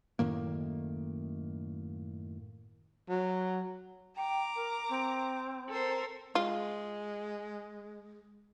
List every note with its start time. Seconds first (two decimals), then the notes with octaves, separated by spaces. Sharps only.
0.19 F#2 A2 D#3 A#3
3.09 F#3
4.16 G5 A#5 D6
4.55 A#4
4.89 C4
5.68 A4 A#4 C5
6.35 G#3 F4